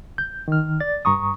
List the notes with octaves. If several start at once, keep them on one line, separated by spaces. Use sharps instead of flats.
G6
D#3 F6
D5 A6
G2 A#5 C#6 D#6